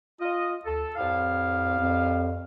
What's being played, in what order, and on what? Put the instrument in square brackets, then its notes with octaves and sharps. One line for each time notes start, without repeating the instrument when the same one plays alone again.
[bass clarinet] F4 [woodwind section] D#5
[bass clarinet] D2 [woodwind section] A4
[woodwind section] C2 A2 F5 [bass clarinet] F2
[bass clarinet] F2